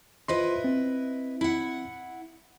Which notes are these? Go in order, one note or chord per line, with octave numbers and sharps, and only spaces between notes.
E4 F4 B4 C5 D#5 C6
C4
E4 F#5